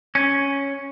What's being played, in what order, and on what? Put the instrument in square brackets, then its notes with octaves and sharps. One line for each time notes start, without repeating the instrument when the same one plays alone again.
[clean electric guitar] C#4